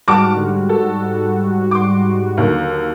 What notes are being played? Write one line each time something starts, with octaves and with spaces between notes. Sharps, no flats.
G#2 G3 F#4 A5 D6 F6
D3
A4
C6 D6
D#2 D3 F#3